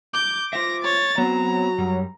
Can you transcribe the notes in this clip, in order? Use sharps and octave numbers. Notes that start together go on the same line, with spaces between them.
D6 G6
F4 C5 E5 A#6
C#5 A6
F#3 B3 C4 A#5
F#2 G3